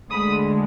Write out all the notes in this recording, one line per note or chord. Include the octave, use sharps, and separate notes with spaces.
D2 D3 G#3 B5 D#6